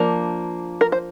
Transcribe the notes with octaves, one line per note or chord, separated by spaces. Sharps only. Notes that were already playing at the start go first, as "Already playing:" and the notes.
Already playing: F3 A#3 D4
A#4
C5